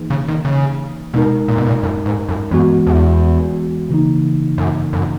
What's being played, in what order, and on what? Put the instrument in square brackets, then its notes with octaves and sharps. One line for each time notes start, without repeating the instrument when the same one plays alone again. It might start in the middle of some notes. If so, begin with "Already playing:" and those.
Already playing: [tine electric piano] E3 A#3 D#4 G#4 B4
[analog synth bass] C#3
D#3
C#3
[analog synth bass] B2 [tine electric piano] G#3 D#4 A#4
[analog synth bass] A#2
B2
A#2
F#2
G#2
F#2
[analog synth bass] F#2 [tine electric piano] E3 G#3 B3 F#4
[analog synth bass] E2
[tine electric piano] C#3 E3 A#3 D#4
[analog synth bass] F#2
F#2